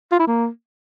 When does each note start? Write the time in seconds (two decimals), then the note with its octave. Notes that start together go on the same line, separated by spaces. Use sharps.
0.12 F4
0.20 E4
0.27 A#3